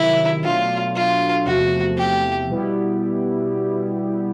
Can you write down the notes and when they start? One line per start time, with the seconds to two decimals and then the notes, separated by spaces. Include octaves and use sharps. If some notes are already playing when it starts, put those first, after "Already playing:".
Already playing: C3 D#3 F#3 E4
0.43 B2 F#3 A3 D4 F4
0.95 F4
1.46 E2 C3 F3 A3 F#4
1.97 G4
2.50 B2 G3 B3 E4 G4